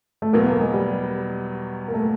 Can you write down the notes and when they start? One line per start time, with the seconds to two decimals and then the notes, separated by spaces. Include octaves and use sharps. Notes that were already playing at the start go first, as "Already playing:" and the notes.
0.22 A3
0.33 E2 B2 F#3 A#3 B3
0.47 A#3
0.60 G#3
0.73 G3
1.88 A#3
1.94 A3